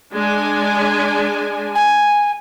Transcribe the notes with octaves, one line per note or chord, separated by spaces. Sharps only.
G#3 D4 G#5
G#5